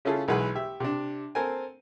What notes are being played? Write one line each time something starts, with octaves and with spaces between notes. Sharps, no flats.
C#3 C#4 E4 F4 G#4 A4
B1 E3 G#3 G#4 B4 F#5
G4 E5
C3 D4
C4 A4 A#4 C5 G#5